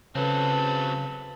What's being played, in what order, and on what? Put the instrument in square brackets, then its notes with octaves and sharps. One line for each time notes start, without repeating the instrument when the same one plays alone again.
[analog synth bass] C#3 [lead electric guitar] F#3 C4 [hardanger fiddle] A4 B4